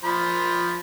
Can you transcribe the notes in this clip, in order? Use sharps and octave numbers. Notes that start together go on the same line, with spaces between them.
F3 C5 B5